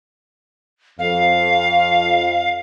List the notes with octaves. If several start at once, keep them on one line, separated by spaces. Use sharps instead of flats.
F2 F5